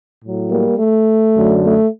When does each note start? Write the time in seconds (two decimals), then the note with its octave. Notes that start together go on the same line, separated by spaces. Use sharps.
0.23 A2 F#3
0.50 G3 A#3
0.78 A3
1.36 F#2 D3 F#3
1.64 A3